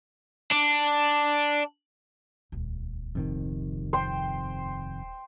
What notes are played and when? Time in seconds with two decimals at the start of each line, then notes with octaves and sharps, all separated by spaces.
0.51 D4
2.52 D#1 C#2
3.15 F2 C3 D#3
3.93 C5 G5 C6